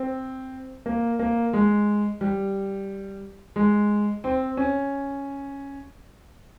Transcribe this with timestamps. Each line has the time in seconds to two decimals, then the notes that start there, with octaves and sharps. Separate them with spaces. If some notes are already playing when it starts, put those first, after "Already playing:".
Already playing: C4
0.86 A#3
1.19 A#3
1.53 G#3
2.21 G3
3.56 G#3
4.24 C4
4.57 C#4